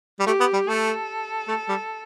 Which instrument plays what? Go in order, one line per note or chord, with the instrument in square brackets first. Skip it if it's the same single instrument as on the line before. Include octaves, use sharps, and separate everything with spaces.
[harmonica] G3
[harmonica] A3 [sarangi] G4
[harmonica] B3
G3
[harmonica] A3 [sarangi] A4
[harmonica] A3
G3